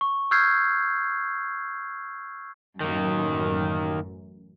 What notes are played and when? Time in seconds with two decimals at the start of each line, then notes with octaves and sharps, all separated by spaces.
0.01 C#6
0.31 C#6 E6 F6 G6 G#6 C7
2.81 A1 F#2 D#3 A#3